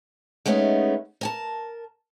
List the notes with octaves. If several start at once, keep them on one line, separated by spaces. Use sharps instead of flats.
G#3 A3 B3 C#4 D#4
A#4 G#5 A5